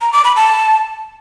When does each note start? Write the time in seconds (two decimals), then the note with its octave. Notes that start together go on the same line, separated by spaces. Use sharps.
0.01 A#5
0.13 D6
0.24 B5
0.36 A5